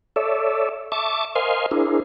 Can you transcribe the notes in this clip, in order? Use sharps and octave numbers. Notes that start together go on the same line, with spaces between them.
A4 C#5 D5 E5
E5 A5 C#6 D6
A#4 C5 D#5 F5 G#5 C6
D4 E4 G#4 A#4 C5